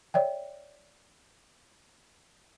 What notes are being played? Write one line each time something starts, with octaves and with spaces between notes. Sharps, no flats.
C#5 D5 E5 G5